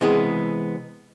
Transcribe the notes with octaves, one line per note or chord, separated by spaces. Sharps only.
C3 E3 G#3 B3 G#4